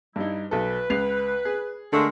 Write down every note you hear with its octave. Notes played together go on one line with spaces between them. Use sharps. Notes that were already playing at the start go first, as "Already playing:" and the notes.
G2 G3 D#4 E4
B1 A4 B4
C#2 C7 F7
G#4
D3 G#3 A3 A#4